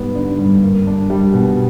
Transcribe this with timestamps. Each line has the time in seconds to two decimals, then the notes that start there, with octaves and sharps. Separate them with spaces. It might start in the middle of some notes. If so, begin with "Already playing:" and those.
Already playing: G#2 G3 B3
0.16 D3
0.39 G2
0.63 A#3
0.87 D4
1.10 G3
1.34 B2